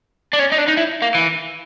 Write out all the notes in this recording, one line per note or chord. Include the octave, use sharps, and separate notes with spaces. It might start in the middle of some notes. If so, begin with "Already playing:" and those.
D4
C#4
D#4
D4
D#4
E4
A#3
E3